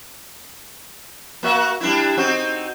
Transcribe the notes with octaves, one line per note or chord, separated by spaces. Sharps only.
A#3 F#4 E5
G3 D4 E4
C4 D#4 F#4